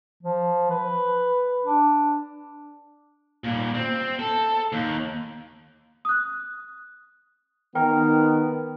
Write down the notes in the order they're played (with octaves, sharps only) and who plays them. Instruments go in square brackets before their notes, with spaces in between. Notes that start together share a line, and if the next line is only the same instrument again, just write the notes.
[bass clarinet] F3
B4
D4
[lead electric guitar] A#2 G3
C4
A4
D#2
[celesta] D#6 F#6
[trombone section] D#3 B3 [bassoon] A#4 [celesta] G5